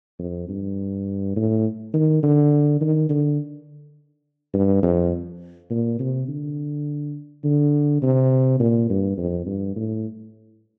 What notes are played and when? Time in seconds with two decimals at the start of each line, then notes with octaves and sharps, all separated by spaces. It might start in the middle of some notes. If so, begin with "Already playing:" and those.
0.19 F2
0.49 G2
1.36 A2
1.94 D#3
2.23 D3
2.81 D#3
3.09 D3
4.54 G2
4.83 F2
5.71 A#2
5.99 C3
6.28 D3
7.44 D3
8.02 C3
8.60 A#2
8.90 G2
9.18 F2
9.47 G2
9.76 A2